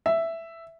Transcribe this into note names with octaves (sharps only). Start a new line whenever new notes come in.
E5